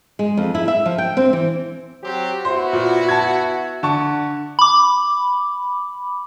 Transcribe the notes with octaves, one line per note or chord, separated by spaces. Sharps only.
G#3
F2
E4
E5
F3
G5
C4
E3
F#3 C4 G4
B3 E4 F#4 C5
A#2
A5 G#6
D3 A5 C#6
B5 D6